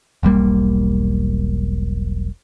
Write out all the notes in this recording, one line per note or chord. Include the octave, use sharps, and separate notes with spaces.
E1 B1 G3 A#3